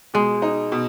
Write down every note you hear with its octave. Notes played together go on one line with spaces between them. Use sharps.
B2 G#3
D#4
B2